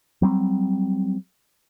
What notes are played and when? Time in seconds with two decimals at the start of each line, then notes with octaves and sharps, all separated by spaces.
0.22 F#3 G3 C4